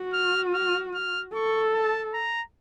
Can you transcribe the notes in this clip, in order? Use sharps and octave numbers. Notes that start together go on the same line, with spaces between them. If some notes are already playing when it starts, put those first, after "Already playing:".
Already playing: F#4
F6
F6
F6
A4 C#6
A5
A#5